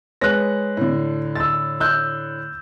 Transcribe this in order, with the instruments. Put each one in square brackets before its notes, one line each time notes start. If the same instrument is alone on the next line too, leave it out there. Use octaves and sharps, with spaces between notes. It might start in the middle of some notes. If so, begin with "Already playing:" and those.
[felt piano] G#3 B4 C#5 [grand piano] F#6 A#6
[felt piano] A2 D3
[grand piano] E6 A6
E6 F#6 G6